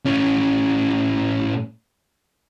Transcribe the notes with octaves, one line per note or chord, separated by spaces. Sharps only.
A2 C#4